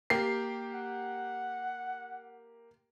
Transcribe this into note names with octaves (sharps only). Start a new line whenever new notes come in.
A#3 G4 C7
F#5